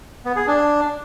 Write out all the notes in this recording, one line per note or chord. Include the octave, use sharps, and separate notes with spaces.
B3
G#4
D4